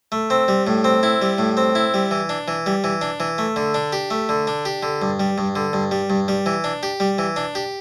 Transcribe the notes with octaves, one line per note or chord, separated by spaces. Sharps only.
A3
C4
G3
A2
C4
E4
G3
A2
C4
E4
G3
E3
D4
E3
G3
E3
D4
E3
A3
D3
D4
G4
A3
D3
D4
G4
D3
G2
G3
G2
D3
G2
G3
G2
G3
E3
D4
G4
G3
E3
D4
G4